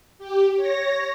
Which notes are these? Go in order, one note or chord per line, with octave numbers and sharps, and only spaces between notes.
G4
C#5 A#6